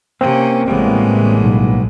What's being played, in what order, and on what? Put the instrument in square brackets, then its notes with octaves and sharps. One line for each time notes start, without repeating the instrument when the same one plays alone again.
[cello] C3 C#4 [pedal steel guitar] A#3 [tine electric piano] C4
[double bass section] A1 C#3 E3 [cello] A2 G#3 [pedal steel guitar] G3 A#3 B3
[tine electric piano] B1